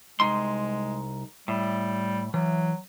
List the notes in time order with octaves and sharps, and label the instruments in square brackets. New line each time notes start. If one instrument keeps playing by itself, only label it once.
[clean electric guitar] C2 D#4 C6 [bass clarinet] G#3
[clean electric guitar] A2 [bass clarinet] G3
[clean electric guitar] E3 [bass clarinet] F#3